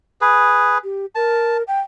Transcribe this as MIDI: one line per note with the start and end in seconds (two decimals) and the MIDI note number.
0.21 0.78 68
0.21 0.78 71
0.83 1.06 67
1.15 1.63 70
1.15 1.57 81
1.68 1.80 79